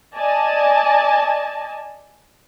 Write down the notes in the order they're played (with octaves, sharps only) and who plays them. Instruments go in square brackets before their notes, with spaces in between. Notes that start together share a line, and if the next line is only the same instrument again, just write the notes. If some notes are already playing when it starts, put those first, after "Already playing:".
[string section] D5 D#5 G#5 A5